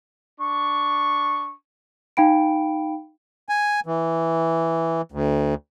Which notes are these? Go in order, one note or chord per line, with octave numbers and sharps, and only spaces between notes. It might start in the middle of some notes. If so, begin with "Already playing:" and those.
D4 C#6
D#4 F5 G5 B5 D7
G#5
E3
D2